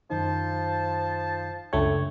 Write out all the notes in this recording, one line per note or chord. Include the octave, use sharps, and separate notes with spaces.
F#2 D#3 F3 D#4 C5 A5
C#2 F#2 A3 D4 C#5 G5